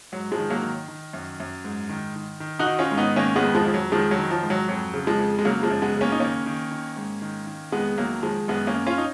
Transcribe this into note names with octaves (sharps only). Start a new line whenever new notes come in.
G#2 F#3
F3 G#3
D#3
F#3 A#3
D#3
D#3
F#2
F#2
G#2
D#3
D#3
D#3
D#4 F#4
D#3
C#4 F4
G#2
B3 D#4
D#3 A#3 C#4
G#3 B3
F2
F3 G#3
F2 F3
F#3
D#3 F3 G#3
F#3
D#3
F3
G#2
F#3
F2 F#3
C#3
F3 G#3
F2
G#3
C#3 F#3 A#3
F3 G#3
F#2
G#3 B3
C#3
A#3 C#4
D#4
D#3 A#3 C#4
D#3
D#3
G#2
D#3
D#3
F2 G#3 B3
D#3 F#3 A#3
D#3 F3 G#3
F#2 G#3 B3
A#3 C#4
F#2
C#4 F4
D#4